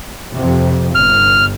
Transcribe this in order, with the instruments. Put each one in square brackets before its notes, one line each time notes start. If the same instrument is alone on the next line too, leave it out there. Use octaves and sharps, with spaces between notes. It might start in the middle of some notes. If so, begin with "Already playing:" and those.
[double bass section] F2 C3
[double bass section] G1 [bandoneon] F6